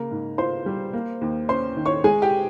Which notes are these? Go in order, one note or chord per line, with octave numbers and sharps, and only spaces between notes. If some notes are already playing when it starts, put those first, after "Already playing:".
Already playing: C#3 A#3 A#4
G#2
F4 C5 C6
G3
A#3
D#2
C#4 C5 C6
D#3
C#5 C#6
G#3 G#4 G#5
G4 G5